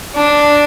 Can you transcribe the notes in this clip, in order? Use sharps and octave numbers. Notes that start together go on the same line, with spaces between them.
D4